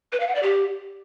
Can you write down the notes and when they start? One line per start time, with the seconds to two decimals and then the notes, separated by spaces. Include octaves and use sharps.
0.12 B4
0.20 F5
0.28 F#5
0.35 D5
0.43 G4